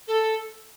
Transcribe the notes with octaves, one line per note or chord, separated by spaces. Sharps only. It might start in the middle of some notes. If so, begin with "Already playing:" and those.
A4